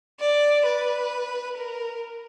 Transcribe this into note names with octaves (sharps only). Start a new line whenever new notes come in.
D5
B4
A#4